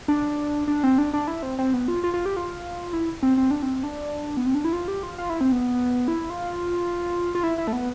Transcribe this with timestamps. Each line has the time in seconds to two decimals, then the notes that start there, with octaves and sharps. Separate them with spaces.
0.08 D4
0.67 D4
0.84 C4
0.98 D4
1.13 D4
1.28 E4
1.43 C4
1.59 C4
1.74 B3
1.88 F4
2.04 F4
2.14 F4
2.26 G4
2.36 F4
2.93 E4
3.23 C4
3.37 C4
3.51 D4
3.62 C4
3.83 D4
4.37 B3
4.46 C4
4.54 D4
4.65 E4
4.73 F4
4.88 G4
5.03 F4
5.18 F4
5.30 E4
5.41 C4
5.52 B3
6.08 E4
6.30 F4
7.35 F4
7.43 E4
7.58 E4
7.67 A3
7.73 B3